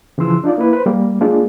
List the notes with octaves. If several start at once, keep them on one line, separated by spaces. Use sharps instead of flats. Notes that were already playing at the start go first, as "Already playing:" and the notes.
C#3 E3 F3 C6 E6
D4 D#4 F4 D5
A#3 E4 B4
B4 C5
G3 A#3
G#3 A#3 D4 F4